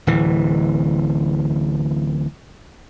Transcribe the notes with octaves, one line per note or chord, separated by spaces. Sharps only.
D1 E3